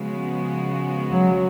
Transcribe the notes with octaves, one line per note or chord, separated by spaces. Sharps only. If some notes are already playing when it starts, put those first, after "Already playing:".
Already playing: C#3 F3 G#3 B3 F#4
F#3